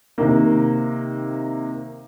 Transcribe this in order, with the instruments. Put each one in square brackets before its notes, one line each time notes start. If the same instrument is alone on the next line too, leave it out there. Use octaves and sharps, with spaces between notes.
[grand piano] C3 D#3 A#3